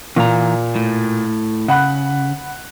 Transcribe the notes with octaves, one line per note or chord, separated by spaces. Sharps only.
A#2 E3 A#5
A2
C#3 F#5 B5 F#6